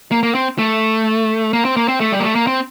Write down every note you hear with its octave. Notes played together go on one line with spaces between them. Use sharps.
A#3
A#3
C4
A3
A#3
C4
A#3
C4
A3
G3
A#3
A3
A#3
C4